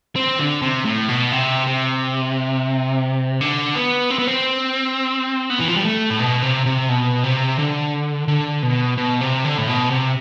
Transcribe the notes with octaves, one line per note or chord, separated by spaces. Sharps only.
C4
D3
C3
A2
B2
C3
C3
D3
B3
C4
B3
C4
B3
E3
F3
G3
A3
A2
B2
C3
C3
B2
C3
D3
D3
B2
B2
C3
D3
A2
B2
C3